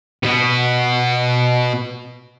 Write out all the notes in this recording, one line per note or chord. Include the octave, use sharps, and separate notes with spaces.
B2 B3